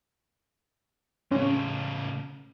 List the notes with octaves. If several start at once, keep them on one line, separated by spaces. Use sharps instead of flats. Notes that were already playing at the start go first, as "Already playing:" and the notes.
A2 C#3 C#4